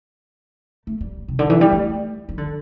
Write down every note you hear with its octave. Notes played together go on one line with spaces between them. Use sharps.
A3
G3
C3
D3
E3
G3
A3
G3
D3